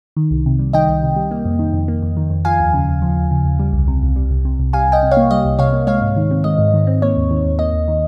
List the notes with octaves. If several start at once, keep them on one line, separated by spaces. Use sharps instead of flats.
D#3
C2
C3
G3
D#3 D#5 G5
C2
C3
G3
A#3
F2
D#3
F2
A#3
F2
D#3
F2
F3 F5 G#5
D#2
C#3
D#2
F3
D#2
C#3
D#2
G3
C2
C3
C2
G3
C2
C3
C2
G3 F5 G#5
C2 D#5 G5
C3
C#5 F5
A#3
G3 D#5
C2
C3 C#5 F5
A#3
G#3 C#5 F5
G#2
D#3
C4
G#3 D#5
G#2
D#3
C4
A#3 C#5
D#2
D#3
D#2
A#3 D#5
D#2
D#3